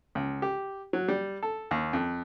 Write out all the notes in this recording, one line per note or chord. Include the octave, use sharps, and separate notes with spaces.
C#2
G4
F#3
G3
A4
D#2
F2